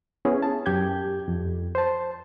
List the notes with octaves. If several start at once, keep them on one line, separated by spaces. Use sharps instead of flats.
B3 C#4 E4 G#4
A5
F#2 G4 G6 G#6
F2
C5 A5